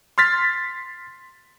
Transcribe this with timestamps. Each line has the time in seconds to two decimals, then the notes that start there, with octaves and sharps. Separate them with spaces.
0.18 C6 F6 A6 B6